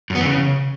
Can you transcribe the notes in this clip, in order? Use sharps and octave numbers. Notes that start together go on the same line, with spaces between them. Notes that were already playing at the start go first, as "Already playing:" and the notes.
F#2
B3
E3
C#3